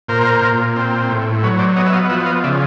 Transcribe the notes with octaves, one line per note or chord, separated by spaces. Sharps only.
A#2 A#4 C5
A#2
C4
A2
F#3 B4 C#5
C5 D5
B3 C#5 D#5
E5
D#5 F5
F3 E5 F#5
D#5 F5
C#3 D5 E5